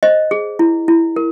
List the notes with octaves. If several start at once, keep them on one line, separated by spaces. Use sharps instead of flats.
C5 D#5
G#4
E4
E4
A#4